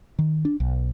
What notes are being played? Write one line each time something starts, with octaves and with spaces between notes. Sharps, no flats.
D#3
D4
B1